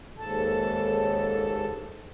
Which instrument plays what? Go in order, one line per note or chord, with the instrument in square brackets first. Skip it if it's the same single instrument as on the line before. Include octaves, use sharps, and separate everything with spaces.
[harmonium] D#2 G#2 C#3 A4 A5